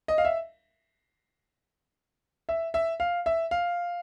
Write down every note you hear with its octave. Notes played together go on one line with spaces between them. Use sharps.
D#5
F5
E5
E5
E5
F5
E5
F5